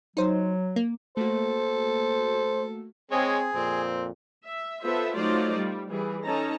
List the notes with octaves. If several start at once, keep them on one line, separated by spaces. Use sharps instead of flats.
F#3 D#4 C5
A#3
A3 A#3 F#4 A4 C5
G#3 C4 G#4 C#5
F2 A#2 C4
E5
B3 F4 A4 C5 E5
F#3 A3 D#4 F4 C5 D5
G3
E3 G3 G#4
C#4 D#4 A4 A5 A#5